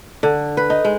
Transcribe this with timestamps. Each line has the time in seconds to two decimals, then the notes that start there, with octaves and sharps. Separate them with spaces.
0.23 D3
0.57 B4
0.70 D#4
0.85 G#3